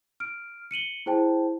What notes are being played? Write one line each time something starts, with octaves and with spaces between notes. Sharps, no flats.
F6 D7
C#7 D#7 F#7 G7
E4 G#4 C5 G5 A5